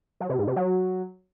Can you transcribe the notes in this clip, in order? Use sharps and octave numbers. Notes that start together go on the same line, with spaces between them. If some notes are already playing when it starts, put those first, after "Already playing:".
F#3
C3
G#2
C3
F#3